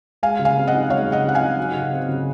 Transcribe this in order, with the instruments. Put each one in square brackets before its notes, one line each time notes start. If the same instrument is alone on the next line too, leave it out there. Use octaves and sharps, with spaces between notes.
[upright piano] G#3 [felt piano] F5 G#5
[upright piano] C#3
[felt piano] F5 G#5
[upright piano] C4
[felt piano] D#5 F#5
[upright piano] D#4
[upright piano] G#3 [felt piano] C#5 F5
[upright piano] C#3
[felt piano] D#5 F#5
[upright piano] C4 [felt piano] F#5
[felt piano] F5 G#5
[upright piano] D#4
F#3
C#3
C4
C#3